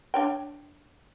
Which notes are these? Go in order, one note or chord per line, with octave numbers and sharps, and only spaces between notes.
D4 C#5 G5